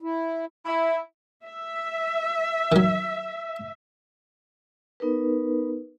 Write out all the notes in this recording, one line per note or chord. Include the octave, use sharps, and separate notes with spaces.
E4
E4
E5
D#3 F#3
B3 D#4 A#4 B4